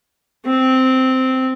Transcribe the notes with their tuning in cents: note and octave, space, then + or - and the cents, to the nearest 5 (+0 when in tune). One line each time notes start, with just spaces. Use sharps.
C4 -10